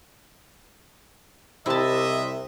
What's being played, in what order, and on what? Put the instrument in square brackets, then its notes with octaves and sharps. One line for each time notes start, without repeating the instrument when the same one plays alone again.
[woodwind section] C2 C3 [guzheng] E4 A5 [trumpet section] D#5 E5